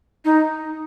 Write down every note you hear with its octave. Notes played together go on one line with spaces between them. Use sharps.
D#4